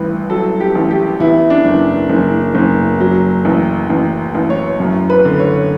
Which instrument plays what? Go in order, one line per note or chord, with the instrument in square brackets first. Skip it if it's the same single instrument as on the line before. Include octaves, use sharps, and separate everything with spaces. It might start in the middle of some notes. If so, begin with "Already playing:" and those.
Already playing: [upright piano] A1 G2 B4
F#3 A4
G4
A1
G4
E2 E4
D4
F#1
F#1
F#1
F#3
A1
A1
A1
C#5
F#2
B4
D3
C#5